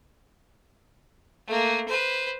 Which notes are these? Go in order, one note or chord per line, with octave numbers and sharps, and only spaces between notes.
A3 A#3
B4 C5